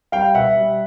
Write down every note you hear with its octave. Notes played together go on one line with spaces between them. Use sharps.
G3 F5 G5
B2 E5 F#5
G3